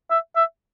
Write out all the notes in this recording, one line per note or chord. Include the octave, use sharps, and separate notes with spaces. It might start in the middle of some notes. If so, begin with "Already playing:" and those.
E5
E5